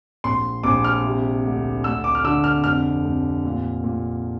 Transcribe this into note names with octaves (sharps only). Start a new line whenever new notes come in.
A#1 C6
A#1 D6
F6
C3
D2
D2 E6
D6
F6
D3 E6
F6
F1 F6
F1
A#2
A#2